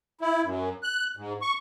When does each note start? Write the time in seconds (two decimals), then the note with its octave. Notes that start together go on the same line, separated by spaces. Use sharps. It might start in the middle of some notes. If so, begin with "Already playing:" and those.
0.21 E4
0.43 F#2
0.83 F#6
1.17 G#2
1.42 C#6